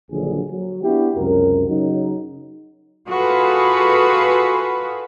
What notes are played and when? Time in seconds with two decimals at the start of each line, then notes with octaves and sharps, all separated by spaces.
0.11 A#1 D3 D#3 F#3 G#4
0.50 F#3
0.83 B3 D4 E4 F#4 G4
1.17 C#2 F#2 C3 A#4
1.69 C#3 F#3 D#4
3.07 F4 F#4 G#4 A4 B4